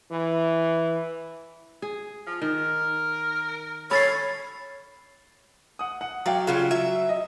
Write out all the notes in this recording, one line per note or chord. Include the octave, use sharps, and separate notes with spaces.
E3
G#4
F3
D#3 A#4
A4 C#5 B5 A6 C7
F#5 D#6
F#5
F#3 D5 F5 G5
C#3 F#3 G3 F4
F#3 E5
D#5